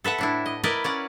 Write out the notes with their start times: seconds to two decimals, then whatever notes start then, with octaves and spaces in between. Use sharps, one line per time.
0.04 A4 B4 E5 F#5
0.18 A2 D4 E4
0.46 D#5
0.64 E4 A#4 B4 D5 D#5
0.84 C#4 D5 F#5